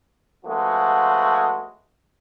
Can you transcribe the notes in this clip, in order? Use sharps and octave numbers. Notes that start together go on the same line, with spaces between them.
F3 G#3 A3 B3 C#4 F#4